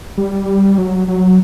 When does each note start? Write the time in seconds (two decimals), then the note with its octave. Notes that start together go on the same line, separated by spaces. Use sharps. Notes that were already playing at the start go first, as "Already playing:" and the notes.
0.18 G3
0.78 F#3
1.08 F#3